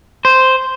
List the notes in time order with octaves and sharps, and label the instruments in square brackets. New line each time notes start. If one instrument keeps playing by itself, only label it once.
[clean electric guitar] C5